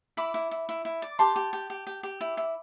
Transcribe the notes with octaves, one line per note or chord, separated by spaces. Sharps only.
E4 B5 D6
E4
E4
E4
E4
D5
G4 A5 C6
G4
G4
G4
G4
G4
E4
E4